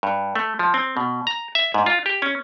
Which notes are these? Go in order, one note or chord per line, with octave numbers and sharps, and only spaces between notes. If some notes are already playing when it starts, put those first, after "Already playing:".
G2
A3
F3
C4
B2
A#5
E5
G#2
F4
G4
C#4